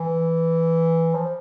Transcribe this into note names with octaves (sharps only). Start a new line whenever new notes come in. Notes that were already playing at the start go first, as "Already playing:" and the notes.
Already playing: E3
F3